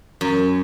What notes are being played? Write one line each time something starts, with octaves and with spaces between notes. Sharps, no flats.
F#2